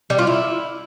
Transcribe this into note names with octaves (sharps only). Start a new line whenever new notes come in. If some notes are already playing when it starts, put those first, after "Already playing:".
G3
F4
E4